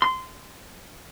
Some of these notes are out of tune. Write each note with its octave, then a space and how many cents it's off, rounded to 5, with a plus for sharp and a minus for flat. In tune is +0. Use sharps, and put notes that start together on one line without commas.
C6 -20